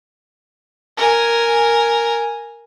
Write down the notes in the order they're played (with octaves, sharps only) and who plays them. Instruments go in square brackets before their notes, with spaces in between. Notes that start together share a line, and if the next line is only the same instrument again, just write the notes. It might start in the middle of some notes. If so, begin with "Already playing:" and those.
[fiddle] A#4 G#5